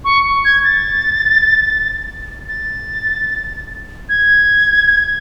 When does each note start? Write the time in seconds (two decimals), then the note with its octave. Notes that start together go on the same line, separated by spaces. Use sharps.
0.05 C#6
0.45 G#6
0.64 A6
2.48 A6
4.09 G#6